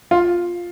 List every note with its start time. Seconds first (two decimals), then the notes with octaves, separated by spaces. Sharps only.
0.11 F4